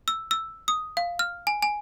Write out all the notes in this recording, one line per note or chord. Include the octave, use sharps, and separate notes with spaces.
E6
E6
D#6
F5
F6
G#5
G#5